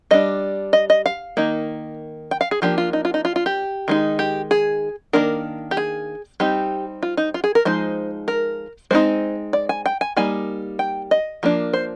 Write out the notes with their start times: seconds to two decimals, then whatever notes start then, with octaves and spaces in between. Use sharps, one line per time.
0.11 G3 D4 D#5
0.73 D#5
0.90 D#5
1.06 F5
1.37 D#3 A#3 D#4
2.31 G5
2.41 F5
2.51 G#4
2.62 F3 A#3 D4 G4
2.78 F4
2.93 D#4
3.05 F4
3.14 D#4
3.25 F4
3.36 F4
3.46 G4
3.88 D#3 G#3 D#4
4.19 G4
4.51 G#4
5.13 D#3 A#3 D4 A#4
5.71 G4
5.77 G#4
6.40 G3 C4 D#4 G4
7.03 F4
7.17 D#4
7.34 F4
7.44 G#4
7.55 A#4
7.65 F3 G#3 D#4 C5
8.28 A#4
8.91 G#3 C4 D#4 C5
9.53 D5
9.69 G#5
9.86 G5
10.01 G#5
10.16 G3 A#3 D#4 G#5
10.79 G5
11.11 D#5
11.43 F3 A#3 D4
11.73 C5